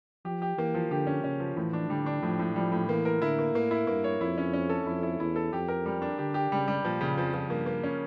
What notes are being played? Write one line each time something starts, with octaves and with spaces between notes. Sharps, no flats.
F3 G4
G4
E3 A#3
F3
D3 G4
C#4
C#3 C#4
F3
A2 E3
D4
D3 G3
D4
A2 F3
A2
F3 G3
A2
E3 A#3
A#4
D3 E4
A#3
A2 A#3
E4
G2 A#3
C#5
F2 E4
C#4
C#4
A4
F2 E4
E4
E2 E4
A4
F2 G4
A#4
G3
D4
D3 G4
G4
C#3 G3
G3
A#2 F3
C#3
F2 F3
F3
G2 A#3
A#3
C#4